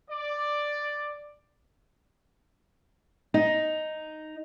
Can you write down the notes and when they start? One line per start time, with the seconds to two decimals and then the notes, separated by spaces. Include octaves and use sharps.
0.11 D5
3.34 D#4